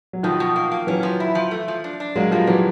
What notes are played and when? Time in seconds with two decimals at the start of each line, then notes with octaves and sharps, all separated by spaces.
0.13 F#3
0.23 B2 D#3 F3
0.40 B2
0.56 A#3
0.71 A#3
0.87 E3 F#3 C#4
1.03 F3
1.20 E4
1.35 F3
1.51 A3
1.68 F3
1.84 D4
2.00 D4
2.15 F#3 G#3 A#3
2.31 F3 G3 A#3
2.47 E3 F#3 G3